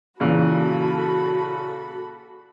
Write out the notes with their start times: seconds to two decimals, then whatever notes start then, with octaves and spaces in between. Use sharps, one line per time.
0.20 A#2 C#3 E3 F#4 A4 B5